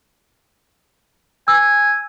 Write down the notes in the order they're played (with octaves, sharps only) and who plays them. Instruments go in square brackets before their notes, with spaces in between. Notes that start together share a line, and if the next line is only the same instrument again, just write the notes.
[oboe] G#5 [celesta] E6